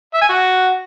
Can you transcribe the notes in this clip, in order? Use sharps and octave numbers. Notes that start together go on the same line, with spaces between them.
E5
G#5
F#4